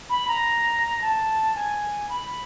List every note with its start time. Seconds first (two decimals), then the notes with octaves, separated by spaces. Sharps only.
0.10 B5
0.28 A#5
1.01 A5
1.55 G#5
2.09 B5